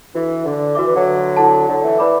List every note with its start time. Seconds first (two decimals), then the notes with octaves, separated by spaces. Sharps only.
0.14 E3 D4 F#4 A4
0.45 D3
0.75 E3 F#4 B4 E5 D6
0.86 E3
0.96 D3 F#3
1.37 E4 A4 F#5 A5
1.67 D3 F#3
1.83 E3 A3
1.99 E3 B4 D5 B5 D6